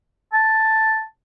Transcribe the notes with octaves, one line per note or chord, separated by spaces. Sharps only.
A5